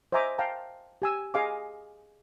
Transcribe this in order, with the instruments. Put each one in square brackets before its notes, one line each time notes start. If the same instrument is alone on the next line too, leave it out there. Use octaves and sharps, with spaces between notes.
[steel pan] C5 D#5 E5 G#5 A#5 D6
F5 G5 A5 A#5
G4 G#5 E6
G#4 D#5 F5 G#5 D6